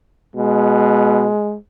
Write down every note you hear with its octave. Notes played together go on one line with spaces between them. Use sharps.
B2 G#3